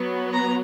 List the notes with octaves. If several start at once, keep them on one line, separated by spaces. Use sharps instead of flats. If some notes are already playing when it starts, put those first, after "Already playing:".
Already playing: F#3 B3
A#5